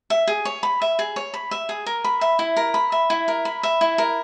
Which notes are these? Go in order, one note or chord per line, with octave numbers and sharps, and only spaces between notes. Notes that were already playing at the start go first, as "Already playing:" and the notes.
E5
G#4
C#5
B5
E5
G#4
C#5
B5
E5
G#4
A#4
B5
E5
E4
A#4
B5
E5
E4
A#4
B5
E5
E4
A#4